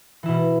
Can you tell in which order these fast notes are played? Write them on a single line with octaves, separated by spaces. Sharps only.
E3 E4 B2